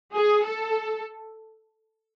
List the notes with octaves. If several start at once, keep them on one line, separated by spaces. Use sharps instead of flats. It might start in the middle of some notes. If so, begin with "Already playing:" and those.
G#4
A4